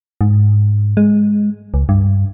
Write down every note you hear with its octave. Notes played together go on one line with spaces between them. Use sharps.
G#2
G#3
C#2
G2